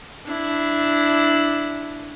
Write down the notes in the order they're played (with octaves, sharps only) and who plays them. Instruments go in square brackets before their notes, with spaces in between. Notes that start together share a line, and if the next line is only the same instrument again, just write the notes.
[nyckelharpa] D4 E4